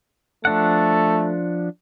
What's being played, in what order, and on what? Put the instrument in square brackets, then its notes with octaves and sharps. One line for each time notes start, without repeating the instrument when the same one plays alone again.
[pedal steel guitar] F3 D4 F#5 [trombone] A3